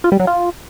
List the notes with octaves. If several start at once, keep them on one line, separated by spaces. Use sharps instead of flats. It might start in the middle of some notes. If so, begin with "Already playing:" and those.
F4
G3
F#3
F4